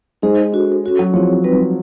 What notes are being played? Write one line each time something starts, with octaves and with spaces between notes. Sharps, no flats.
G#3 D#4 G#4 C5 D#5
D4 F#4 A4 C5
C#4 F#4 A4 C#5
F#3
F3 C4 E4 G#4 C#5
G3 C4 D#4 F#4 B4